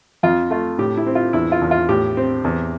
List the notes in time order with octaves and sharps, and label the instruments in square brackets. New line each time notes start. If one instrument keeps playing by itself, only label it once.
[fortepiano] F2 F4
A3 F4
A2 G4
E4
C4
F4
E2 E4
F4
E2
F4
A2 G4
C4
E2